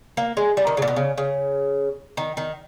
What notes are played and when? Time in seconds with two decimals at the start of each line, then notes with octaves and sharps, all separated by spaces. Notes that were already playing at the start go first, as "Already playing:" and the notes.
0.17 A#3
0.37 G#3
0.57 G3
0.67 D#3
0.77 C#3
0.82 A#2
0.88 B2
0.96 C#3
1.18 C#3
2.17 D#3
2.37 D#3